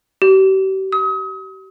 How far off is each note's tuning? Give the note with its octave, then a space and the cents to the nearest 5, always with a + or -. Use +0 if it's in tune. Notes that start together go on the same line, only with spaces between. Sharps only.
G4 -40
D#6 +35